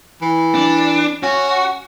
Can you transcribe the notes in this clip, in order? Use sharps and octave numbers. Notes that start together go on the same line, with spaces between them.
E3
D4
C#4 F#4